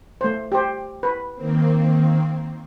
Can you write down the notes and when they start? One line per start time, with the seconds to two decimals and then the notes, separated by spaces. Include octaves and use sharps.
0.21 A3 C5
0.52 G4 C5
1.03 B4
1.35 D#3 A#3 C4